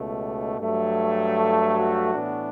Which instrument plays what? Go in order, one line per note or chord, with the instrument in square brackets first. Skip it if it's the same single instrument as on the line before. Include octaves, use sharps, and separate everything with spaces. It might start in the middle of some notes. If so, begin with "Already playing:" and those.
Already playing: [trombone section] C#2 B2 A3
G2 F#3 A3
A4
F#4
A2 E3 B3 D4